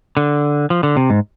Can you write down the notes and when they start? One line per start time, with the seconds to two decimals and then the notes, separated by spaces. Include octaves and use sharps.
0.17 D3
0.70 F3
0.83 D3
0.97 C3
1.10 G#2